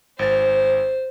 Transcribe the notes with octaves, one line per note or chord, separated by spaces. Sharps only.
G#1 C5 A6